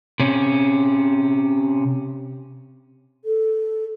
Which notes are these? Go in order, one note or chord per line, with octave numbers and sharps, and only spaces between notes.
C3 C#4
A4